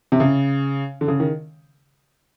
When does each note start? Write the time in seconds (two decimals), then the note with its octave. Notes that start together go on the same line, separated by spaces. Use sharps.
0.12 C3
0.20 C#3
1.01 D3
1.08 C#3
1.20 D#3